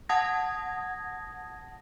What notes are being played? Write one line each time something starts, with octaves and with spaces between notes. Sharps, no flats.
F#5 A5 D#6 G#6 A#6